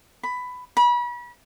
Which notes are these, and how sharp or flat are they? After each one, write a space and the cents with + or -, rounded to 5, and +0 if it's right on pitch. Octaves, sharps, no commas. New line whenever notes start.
B5 +15
B5 -35